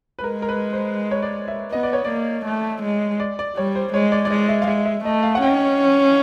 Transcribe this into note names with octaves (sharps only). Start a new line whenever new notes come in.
B4
G#3 A#4
A#4
B4
C5
C#5
D5
E5
B3 D#5
D5
C#5
A#3 D5
A3
G#3
D5
D5
G3 C#5
C5
G#3 C#5
D5
D5
G#3 D#5
E5
F5
G#3 E5
E5
A3 D#5
F5
F#5
C#4 G5